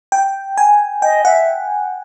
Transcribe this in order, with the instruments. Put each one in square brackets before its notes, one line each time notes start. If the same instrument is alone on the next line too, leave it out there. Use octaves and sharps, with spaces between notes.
[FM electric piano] G5
G#5
[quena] D#5 [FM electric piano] G5
[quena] E5 [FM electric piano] F#5